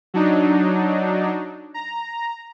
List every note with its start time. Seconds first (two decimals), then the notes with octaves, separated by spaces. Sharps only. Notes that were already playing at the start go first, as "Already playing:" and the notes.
0.14 F#3 D4 D#4
1.74 A#5